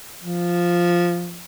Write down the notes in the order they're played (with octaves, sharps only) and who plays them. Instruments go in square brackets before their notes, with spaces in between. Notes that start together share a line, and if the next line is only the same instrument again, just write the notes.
[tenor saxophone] F3